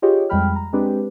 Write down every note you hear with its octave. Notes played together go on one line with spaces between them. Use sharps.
F4 G4 G#4 C#5 D#5 G5
F2 G3 G#3 G5 B5 F6
A#5
G#3 C4 D4 G4 B4